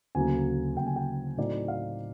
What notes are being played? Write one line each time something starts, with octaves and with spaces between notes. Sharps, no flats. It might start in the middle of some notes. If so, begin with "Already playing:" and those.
D2 C#3 F#3 A#3 G#5
D2 C#3 F#3 A#3 G5
G#5
G5
A2 F#3 A3 C4 D#4 D5
F5